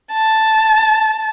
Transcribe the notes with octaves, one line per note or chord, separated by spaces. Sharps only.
A5